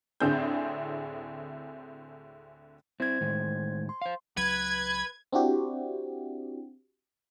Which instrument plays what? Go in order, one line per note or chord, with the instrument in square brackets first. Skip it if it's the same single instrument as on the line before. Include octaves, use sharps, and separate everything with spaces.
[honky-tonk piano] D2 A2 D3 C4 G#4 G6
[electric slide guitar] C4 E4 [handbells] C5 G#6
[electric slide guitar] A2 D#3 G#3
[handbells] C6
[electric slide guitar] C5 F5
[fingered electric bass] C#2 F#3 [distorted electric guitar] B4 [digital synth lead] G#6
[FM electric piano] C4 D4 E4 F#4 G4